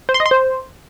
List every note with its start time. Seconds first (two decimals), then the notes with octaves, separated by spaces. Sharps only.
0.09 C5
0.14 C6
0.20 D#5
0.26 C6
0.31 C5